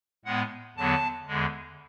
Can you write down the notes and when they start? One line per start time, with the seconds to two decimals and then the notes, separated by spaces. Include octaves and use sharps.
0.25 A2 G#3 B3 F#5
0.76 E2 D3 F#3 B3 A5
1.27 E2 D3 G#3